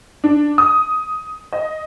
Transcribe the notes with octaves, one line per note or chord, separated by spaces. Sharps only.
D4
D#6
D#5